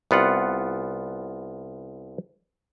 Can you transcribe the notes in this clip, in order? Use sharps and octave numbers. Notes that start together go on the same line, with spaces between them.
C2 B3 F4 F#5